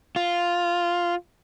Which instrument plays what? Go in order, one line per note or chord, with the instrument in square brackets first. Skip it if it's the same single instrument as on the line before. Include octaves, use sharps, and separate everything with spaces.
[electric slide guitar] F4